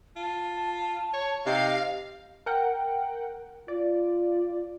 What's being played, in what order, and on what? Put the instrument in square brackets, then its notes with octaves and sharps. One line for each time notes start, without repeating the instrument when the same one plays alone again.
[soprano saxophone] F4 [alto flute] A5
[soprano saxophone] C#5
[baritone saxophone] C3 [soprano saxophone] D#4 [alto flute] D#5 [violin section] F5
[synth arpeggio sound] A#4 F#5 G5
[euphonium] F4 [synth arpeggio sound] D5